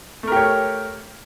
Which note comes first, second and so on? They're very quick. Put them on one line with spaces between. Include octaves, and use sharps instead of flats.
A3 A#4 G4 C#5